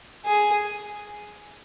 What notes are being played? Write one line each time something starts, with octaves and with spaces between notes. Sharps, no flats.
G#4